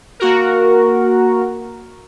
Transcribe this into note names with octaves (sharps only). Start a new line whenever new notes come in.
A#3 F#4 A#4